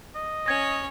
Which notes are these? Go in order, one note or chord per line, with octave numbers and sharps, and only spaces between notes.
D#5
C#4 C#5 G#6 A#6